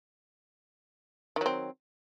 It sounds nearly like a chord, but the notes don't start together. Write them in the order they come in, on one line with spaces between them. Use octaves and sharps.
D#3 F#3 C4